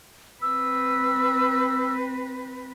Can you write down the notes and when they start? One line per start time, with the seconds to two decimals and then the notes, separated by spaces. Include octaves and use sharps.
0.42 C4 B4 E6